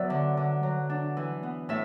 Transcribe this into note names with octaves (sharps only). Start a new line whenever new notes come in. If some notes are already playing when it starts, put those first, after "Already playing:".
Already playing: F#3 B3 D5 E5
D3
D3
F#3
D4
E3
B3
A2 E5